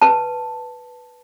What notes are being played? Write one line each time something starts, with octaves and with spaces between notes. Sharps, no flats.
B4 A5